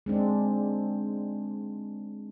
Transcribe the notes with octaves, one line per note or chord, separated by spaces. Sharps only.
G#3 C4 D4